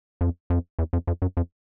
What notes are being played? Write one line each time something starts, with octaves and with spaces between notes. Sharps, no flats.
F2
F2
E2
F2
F2
F#2
F2